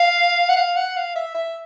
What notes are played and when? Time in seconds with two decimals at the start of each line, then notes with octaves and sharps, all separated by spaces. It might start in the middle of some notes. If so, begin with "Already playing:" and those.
Already playing: F5
0.49 F#5
0.57 F5
0.76 F#5
0.96 F5
1.16 E5
1.35 E5